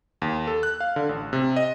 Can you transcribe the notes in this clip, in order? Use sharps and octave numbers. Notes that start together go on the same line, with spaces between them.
D#2
A4
F#6
F5
D3
A1
C3
D#5